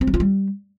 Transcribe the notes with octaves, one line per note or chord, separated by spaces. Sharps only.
C4
F#3
F4
G3